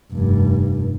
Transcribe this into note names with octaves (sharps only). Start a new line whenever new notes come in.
F1 G2